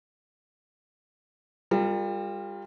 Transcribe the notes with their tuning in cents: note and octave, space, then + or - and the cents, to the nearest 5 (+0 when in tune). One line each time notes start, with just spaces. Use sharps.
G3 +30 F4 +10 A#4 -30